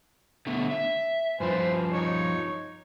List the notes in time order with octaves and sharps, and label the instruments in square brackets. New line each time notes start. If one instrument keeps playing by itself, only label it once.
[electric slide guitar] D3 A3 B3
E5
[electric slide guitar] G2 F3 [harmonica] B4 C5 G#5
[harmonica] D#4 C#5